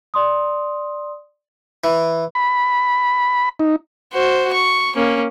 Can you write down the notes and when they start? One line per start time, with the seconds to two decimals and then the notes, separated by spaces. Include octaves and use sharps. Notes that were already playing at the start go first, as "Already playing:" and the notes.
0.14 D5 C6 D#6
1.84 E3
2.35 B5
3.59 D#4
4.13 F#4 C5
4.53 C#6
4.96 A#3 C#4